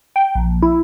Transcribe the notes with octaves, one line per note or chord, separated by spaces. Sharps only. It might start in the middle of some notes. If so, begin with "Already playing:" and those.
G5
A#1
E4